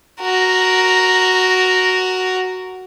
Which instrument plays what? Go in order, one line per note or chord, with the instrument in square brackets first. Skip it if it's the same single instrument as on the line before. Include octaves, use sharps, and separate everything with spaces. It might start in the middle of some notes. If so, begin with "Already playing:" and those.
[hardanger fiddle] F#4 A#4